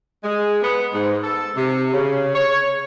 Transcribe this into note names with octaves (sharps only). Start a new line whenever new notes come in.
G#3
B3
G#2
A4
C3
C#3
C#5